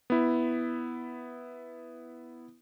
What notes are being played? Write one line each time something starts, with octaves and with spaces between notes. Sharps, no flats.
B3 E4